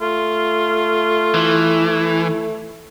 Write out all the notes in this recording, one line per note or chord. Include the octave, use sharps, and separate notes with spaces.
A3 F4
E3